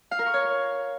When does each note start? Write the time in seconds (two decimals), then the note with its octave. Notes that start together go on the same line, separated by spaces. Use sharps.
0.11 F5
0.19 A#4
0.26 C#6
0.34 C#5